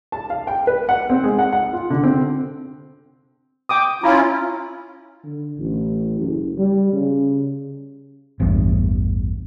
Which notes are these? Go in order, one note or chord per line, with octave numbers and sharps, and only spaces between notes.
A5
F5
G5
B4
F#5
C4
G#3
F#5
F#5
F4
D3
C4
G5 D6 D#6
C#4 E4 F4 A#5 B5
D3
A1
F#1
G3
C#3
A1 E2 G2